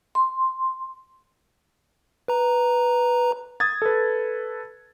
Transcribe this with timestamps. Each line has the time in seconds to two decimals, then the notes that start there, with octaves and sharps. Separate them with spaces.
0.15 C6
2.28 B4 A#5
3.60 D#6 G#6 A6
3.82 A4 B4